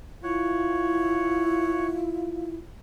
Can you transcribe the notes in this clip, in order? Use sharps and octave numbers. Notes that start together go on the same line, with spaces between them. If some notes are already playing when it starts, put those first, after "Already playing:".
E4 F4 C#5 F#5